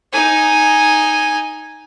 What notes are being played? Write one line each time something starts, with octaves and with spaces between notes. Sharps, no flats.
D#4 G#5